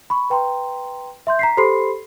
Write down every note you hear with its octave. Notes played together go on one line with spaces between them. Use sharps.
B5 C#6
B4 G5 A#5 C6
E5 C6 G6
A#5 B6 C7
G4 A4 C5 B5 C6 C7